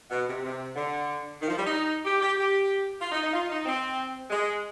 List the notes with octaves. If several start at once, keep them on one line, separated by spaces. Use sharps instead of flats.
B2
C3
C3
D3
D#3
F3
G3
D#4
G4
G4
G4
F4
D#4
D#4
F4
D#4
C4
G#3